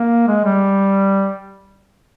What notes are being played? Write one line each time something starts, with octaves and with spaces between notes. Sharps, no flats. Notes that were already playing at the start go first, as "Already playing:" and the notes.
Already playing: A#3
G#3
G3